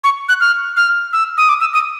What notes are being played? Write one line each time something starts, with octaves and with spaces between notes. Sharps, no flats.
C#6
F#6
F6
F6
E6
D#6
D6
E6
D#6